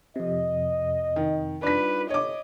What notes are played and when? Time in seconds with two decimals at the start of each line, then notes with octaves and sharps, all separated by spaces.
0.16 F2 C3 D#5
1.16 D#3
1.63 G3 D4 D#4 F4 B4 B6
2.10 G1 C#5 D#5 D6